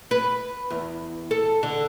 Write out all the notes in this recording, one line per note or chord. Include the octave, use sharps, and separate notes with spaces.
B4
E2
A4
D3